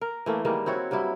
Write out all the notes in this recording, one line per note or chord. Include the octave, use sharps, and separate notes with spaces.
A#4
E3 A3 A#3
D#3 G3 G#3 A#3
C4 E4 F#4 C#5
G2 F#3 G3 E4